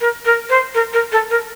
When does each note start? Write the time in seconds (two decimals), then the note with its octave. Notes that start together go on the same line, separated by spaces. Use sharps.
0.01 A#4
0.25 A#4
0.49 C5
0.75 A#4
0.93 A#4
1.12 A4
1.30 A#4